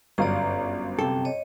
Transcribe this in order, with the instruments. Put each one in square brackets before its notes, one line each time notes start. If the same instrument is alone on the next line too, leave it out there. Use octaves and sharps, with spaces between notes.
[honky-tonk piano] G1 F#2 F5 [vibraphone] D5 A#5
[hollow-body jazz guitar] C3 A4 [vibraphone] G5
[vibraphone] C#5 D#5